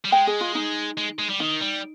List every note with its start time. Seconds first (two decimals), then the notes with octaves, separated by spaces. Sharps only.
0.05 G3
0.12 G#3 G5
0.27 G#4
0.41 F4
0.55 D#4
0.97 G#3
1.19 G#3
1.29 G3
1.40 D#3 D#4
1.61 G3